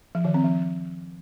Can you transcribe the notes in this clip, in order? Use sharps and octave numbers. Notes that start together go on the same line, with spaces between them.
F3
D#3
C4
F3